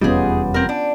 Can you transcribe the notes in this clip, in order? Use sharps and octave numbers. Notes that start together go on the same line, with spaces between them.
F1 E2 G3 B3 C#4 D#4 F4 G#4
C4 A#4
D4